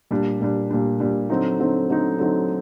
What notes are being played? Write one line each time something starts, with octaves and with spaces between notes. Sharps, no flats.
A#2 G3 D4
A#2 G3 D4
A#2 G3 D4
A#2 G3 D4
D3 F#3 C4 D#4
D3 F#3 C4 D#4
D3 F#3 C4 D#4
D3 F#3 C4 D#4